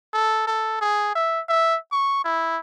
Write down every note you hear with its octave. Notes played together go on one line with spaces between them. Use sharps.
A4
A4
G#4
E5
E5
C#6
E4